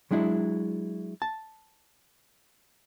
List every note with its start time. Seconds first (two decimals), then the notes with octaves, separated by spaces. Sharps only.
0.11 F#3 G#3 D4 E4
1.22 A5